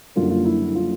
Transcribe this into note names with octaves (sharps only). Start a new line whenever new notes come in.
F#1 F#2 D3 G3 A#3 F4
F4
E4
F4